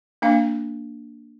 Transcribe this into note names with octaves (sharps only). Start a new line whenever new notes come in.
A#3 D4 F5